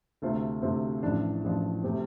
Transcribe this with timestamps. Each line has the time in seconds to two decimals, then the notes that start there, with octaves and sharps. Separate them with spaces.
0.22 D2 C3 A3 C4 F4
0.62 D2 C3 A3 C4 F4
1.03 A1 A2 F3 D4
1.44 A1 A2 F3 D4
1.83 C3 A3 C4 G4